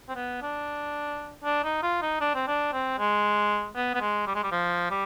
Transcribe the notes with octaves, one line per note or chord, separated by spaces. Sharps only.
C4
B3
D4
D4
D#4
F4
D#4
D4
C4
D4
C4
G#3
B3
B3
G#3
G3
G#3
G3
F3
G3